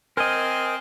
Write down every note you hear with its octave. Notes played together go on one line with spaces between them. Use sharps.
C4 A#4 D#5 G#5